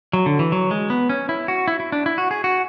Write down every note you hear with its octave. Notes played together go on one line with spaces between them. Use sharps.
F#3
D3
E3
F#3
G#3
B3
C#4
E4
F#4
E4
E4
D4
E4
F#4
G#4
F#4